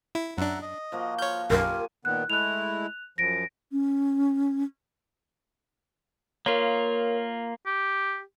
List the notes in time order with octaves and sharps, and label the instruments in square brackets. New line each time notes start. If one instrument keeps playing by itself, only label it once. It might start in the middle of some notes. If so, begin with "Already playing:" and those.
[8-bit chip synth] E4
[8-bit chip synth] F#2 D4 [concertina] E5 F#5 A#5
[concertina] D#5
[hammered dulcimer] F3 A#3 F#4
[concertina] F4 F6 [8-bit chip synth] C#5 G6
[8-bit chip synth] B1 F#2 [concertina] F4 G4 [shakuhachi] A#4 [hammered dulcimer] G#5
[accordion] A#2 D#3 B3 [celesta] F#6
[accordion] G#3 A3 E4 [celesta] F#6 F7
[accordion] F#2 F3 [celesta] A#6 D7
[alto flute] C#4
[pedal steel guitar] A#3 F4 [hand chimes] A#4 C#5
[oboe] G4